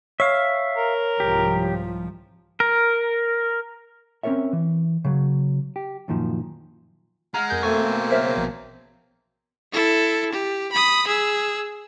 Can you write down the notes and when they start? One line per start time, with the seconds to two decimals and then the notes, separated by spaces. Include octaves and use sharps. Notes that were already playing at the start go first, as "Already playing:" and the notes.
0.20 C#5 E5 F5
0.77 A#4
1.20 C2 G#2 F3 G4
2.60 A#4
4.23 C4 C#4 E4 A#4 C#5 E5
4.53 E3
5.05 C#3 F#3
5.76 G4
6.08 F#2 A#2 D#3 F3
7.34 G#3 F#5 A#5 F6
7.50 F2 G#4 A#4 G6
7.63 B2 A3 A#3 C4 A4 G#5 C#6
8.11 F#2 C#3 F#3 A#4 C5 E5
8.37 A#1
9.73 E4 A4
10.33 G4
10.72 B5 D#6
11.08 G#4 E6